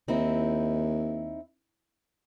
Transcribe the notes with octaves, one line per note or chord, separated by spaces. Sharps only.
D#2 C4 D#4 E4